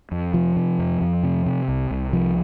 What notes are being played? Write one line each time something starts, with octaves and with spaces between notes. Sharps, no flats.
F2
C3 F3
C3
F2
F2
C3
C3
C2
C2
C3 F3